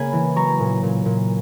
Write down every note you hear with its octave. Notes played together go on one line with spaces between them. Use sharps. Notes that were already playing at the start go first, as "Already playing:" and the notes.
Already playing: C#3 A#3 G#5 B5
E3
F#3 A#5 C#6
A#2
A#2
A#2